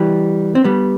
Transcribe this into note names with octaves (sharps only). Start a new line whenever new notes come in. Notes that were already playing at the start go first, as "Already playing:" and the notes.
Already playing: E3 G3
C4
G3 B3